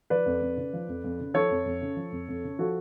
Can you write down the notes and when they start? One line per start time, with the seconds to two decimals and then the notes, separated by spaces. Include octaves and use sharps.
0.10 F3 B4 D5
0.26 F2
0.42 F2
0.57 C#3
0.73 F3
0.88 F2
1.04 F2
1.20 C#3
1.34 F3 A4 C#5
1.51 F2
1.65 F2
1.81 C#3
1.97 F3
2.12 F2
2.28 F2
2.44 C#3
2.59 F3 F#4 A4